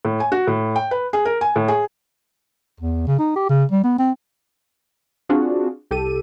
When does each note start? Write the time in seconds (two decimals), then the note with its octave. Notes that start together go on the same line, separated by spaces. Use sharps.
0.05 A2
0.20 G#5
0.32 F#4
0.47 A2
0.76 G5
0.91 B4
1.13 G#4
1.25 A#4
1.41 G#5
1.56 A2
1.68 G#4
2.80 E2
3.07 C#3
3.19 D#4
3.36 G4
3.49 C#3
3.71 G3
3.84 B3
3.98 C4
5.29 C4 D4 F4 F#4 G#4
5.91 C2 G4 A4 D#7